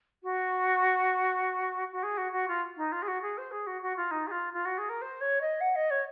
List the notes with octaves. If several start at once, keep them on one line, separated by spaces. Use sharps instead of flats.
F#4
F#4
G#4
F#4
F#4
F4
D#4
F4
G#4
F#4
G#4
C5
G#4
F#4
F#4
F4
D#4
G#4
F4
F4
F#4
G#4
A#4
C5
C#5
D#5
F#5
D#5
C#5